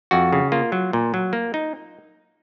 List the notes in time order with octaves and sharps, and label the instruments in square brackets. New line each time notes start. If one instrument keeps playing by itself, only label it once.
[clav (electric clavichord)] F2 F#4
C#3
A#3 F4
F#3
A#2
F#3
A#3
D#4